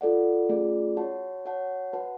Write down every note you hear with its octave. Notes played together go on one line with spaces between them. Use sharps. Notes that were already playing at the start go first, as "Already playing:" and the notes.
F4 A4 D5 F#5
A3 C#4 F4 G#4 D5
F#4 C#5 F#5 A5
F#4 C#5 F#5 A5
F#4 B4 F#5 A5